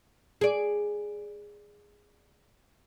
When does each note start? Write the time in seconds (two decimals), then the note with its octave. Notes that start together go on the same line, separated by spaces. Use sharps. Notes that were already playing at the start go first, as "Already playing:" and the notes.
0.41 G#4 D5